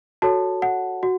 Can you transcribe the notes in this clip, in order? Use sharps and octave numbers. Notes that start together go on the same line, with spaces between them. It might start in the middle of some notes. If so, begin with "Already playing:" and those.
F#4 A4 C#5 A5
F#5
F#4